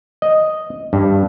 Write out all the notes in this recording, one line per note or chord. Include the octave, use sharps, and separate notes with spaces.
D#5
G2